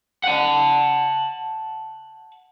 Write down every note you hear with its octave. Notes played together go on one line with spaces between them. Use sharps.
F#5 A5